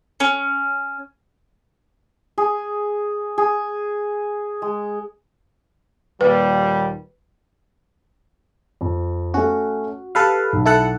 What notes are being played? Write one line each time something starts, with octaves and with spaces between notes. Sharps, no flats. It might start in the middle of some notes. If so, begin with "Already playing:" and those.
C#4
G#4
G#4
G#3
D#2 A#2 G3 B4
F2
A3 C#4 F#4
G4 A4 B4 F5
B1
E4 A4 F#5